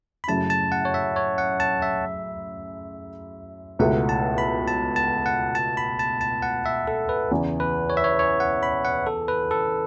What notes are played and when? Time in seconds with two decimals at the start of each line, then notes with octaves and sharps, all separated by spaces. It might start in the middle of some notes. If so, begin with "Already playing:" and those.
0.24 B5
0.28 F#2 C#3 A3 E4 A5
0.50 A5
0.72 F#5
0.85 C#5
0.94 E5
1.16 C#5
1.38 F#5
1.60 A5
1.82 E5
3.79 C#2 B2 A3 E4 A4 F#5
4.09 A5
4.38 B5
4.68 A5
4.96 A5
5.26 F#5
5.55 A5
5.77 B5
5.99 A5
6.21 A5
6.42 F#5
6.66 E5
6.88 A4
7.09 B4
7.31 E2 C#3 E3
7.60 B4
7.90 C#5
7.97 E5
8.04 C#5
8.19 C#5
8.40 F#5
8.63 B5
8.85 F#5
9.06 A4
9.28 B4
9.51 A4